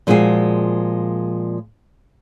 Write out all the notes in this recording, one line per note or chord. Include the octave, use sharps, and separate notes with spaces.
A#2 F3 G#3 F4 F#4 G#4